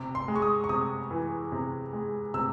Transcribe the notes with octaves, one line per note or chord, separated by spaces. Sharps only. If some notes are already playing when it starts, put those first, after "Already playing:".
Already playing: C3
C6
G#3
C#6
D#6
C#6
C3 D#6
E3
C3
G#3
C3 E6